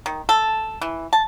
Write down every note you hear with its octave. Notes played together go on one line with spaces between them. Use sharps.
D#3
A4
E3
A5